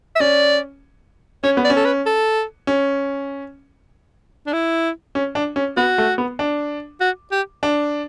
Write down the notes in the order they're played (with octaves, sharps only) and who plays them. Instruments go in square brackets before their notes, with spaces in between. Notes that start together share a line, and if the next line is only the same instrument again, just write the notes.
[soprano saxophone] E5
[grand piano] C#4 [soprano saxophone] D5
[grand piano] C#4 [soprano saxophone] C#5
[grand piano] B3
[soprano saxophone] D5
[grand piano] C#4
[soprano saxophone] A4
B4
A4
[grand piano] C#4
[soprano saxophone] D4
E4
[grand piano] C#4
D4
C#4
[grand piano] B3 [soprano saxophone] F#4
[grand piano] A3
B3
D4
[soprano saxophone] F#4
G4
[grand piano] D4